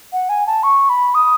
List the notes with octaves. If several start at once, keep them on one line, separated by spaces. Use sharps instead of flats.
F#5
G#5
A5
C#6
B5
D#6